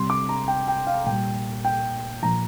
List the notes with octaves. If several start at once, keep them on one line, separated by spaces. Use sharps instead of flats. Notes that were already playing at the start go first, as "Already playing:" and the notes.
Already playing: C3 G3 C6
D6
A#5
G5
G5
F5
A#2 G3 G5
G5
A#2 F3 A#5